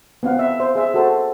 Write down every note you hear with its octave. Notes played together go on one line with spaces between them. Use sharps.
B3 C4 F5 F#5
E5
C5 E5
G#4 E5
F#4 A4 C5 A5